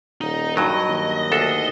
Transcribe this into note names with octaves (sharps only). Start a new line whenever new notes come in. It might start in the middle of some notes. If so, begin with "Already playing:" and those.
D#1 D#4
G2 F#3 D#5
D#2
D2 D4 A4